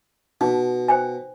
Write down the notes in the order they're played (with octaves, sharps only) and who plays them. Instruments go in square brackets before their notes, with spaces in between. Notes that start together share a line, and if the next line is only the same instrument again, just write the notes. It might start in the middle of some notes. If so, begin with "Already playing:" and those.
[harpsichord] B2 [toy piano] D#4
[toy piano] C5 G5 G#5